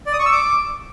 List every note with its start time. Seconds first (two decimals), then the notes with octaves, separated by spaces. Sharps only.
0.06 D5
0.13 D#6
0.19 C#6
0.26 E6
0.32 D6